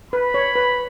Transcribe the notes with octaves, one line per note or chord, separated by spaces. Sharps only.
B4 B5
C#5
B4